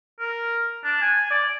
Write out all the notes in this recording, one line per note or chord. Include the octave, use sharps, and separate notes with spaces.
A#4
D4
G#5
D5